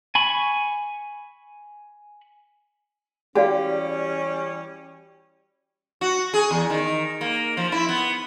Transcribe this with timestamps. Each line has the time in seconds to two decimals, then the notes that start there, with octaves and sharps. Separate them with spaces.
0.15 G#5 B5 C#6
3.35 E3 G3 C#4 F#4 G4 D5 F5
6.01 F#4
6.34 G#4
6.51 E2
6.70 D#3
7.21 A#3
7.57 F3
7.72 E4
7.89 B3